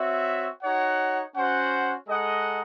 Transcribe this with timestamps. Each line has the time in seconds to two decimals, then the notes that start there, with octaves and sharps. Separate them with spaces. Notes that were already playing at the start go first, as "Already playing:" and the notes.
Already playing: C4 F#4 C#5 E5
0.63 D#4 F#4 C#5 F#5
1.35 C#4 F#4 C5 F#5
2.07 G#3 D#4 A4 D#5 F#5